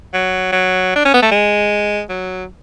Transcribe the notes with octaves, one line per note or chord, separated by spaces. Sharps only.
F#3
F#3
D4
C#4
B3
A3
G#3
F#3